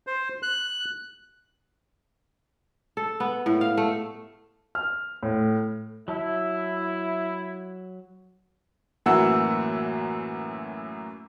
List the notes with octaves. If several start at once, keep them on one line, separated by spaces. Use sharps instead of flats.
C5
F#6
A4
B3
A2
F5
A3
F6
A2
F#3 E4 A5 E6
F#2 A2 E3 A#3 F#5 E6